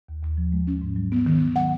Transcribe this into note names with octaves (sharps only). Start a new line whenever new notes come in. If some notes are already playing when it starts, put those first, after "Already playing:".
D#2
D#2
F3
G#3
C#4
G#2
F#3
B3
D#3
D#3
F#3 F#5